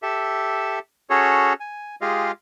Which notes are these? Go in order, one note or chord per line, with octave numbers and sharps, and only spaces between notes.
G4 A4 E5
C#4 F#4 G#4 A4 C#5
G#5
G#3 F4 G4 G#4 D#5 F5